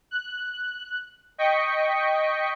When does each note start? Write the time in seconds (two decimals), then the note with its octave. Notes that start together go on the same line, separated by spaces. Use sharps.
0.11 F#6
1.38 D#5 G5 C#6 B6 C#7